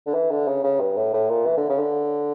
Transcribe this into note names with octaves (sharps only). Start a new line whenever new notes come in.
D3
E3
D3
C#3
C#3
G2
A2
A2
A#2
E3
D3
C#3
D3